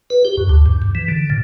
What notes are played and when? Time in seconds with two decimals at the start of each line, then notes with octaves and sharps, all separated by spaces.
0.10 B4
0.25 G4
0.37 F#2
0.49 D2
0.66 G2
0.82 G2
0.95 E3
1.08 D3
1.30 A#2